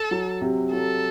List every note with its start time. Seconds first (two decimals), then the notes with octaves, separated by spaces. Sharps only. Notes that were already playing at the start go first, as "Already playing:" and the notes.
Already playing: A4
0.11 F#3
0.41 C3
0.73 F#3 A4